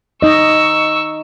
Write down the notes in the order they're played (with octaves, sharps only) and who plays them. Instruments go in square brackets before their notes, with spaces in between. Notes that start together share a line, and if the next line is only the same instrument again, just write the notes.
[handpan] D#4 D#5 [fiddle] C#6 E6